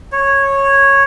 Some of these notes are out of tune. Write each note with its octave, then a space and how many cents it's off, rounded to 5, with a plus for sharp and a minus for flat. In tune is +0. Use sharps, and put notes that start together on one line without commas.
C#5 -10